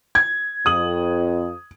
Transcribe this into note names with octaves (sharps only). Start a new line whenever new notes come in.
G#6
F2 D#6 F#7